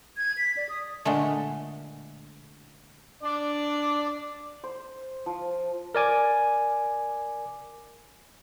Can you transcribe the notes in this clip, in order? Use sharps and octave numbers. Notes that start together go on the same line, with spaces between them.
G#6
B6
D5
D#6
A#2 D3 G#3 A3
D4 D5
C5
F3
A#4 D5 G#5 D6